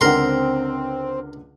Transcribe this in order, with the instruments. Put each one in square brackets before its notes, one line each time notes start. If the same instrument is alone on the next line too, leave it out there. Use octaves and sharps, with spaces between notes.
[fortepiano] C#2 D3 F#5 [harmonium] C4 [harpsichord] A#4 C6